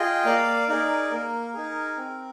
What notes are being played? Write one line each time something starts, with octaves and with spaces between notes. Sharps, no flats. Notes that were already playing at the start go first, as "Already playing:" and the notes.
Already playing: F4 G#4 D#5 G5
A#3 D5 F5
D#4 G#4 A#4 D5
A#3 A#4
D#4 G#4
C4